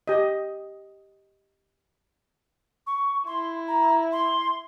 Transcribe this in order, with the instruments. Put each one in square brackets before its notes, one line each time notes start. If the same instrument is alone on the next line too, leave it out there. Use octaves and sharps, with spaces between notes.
[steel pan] G4 D#5
[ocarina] C#6
[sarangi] E4 [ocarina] C6
[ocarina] A#5
C6